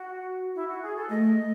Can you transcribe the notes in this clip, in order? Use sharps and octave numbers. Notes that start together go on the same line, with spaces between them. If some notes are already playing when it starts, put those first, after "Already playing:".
Already playing: F#4
E4
F#4
G#4
A4
A3 D#5